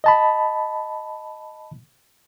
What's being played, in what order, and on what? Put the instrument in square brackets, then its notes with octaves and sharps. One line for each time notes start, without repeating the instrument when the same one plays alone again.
[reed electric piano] D#5 A5 B5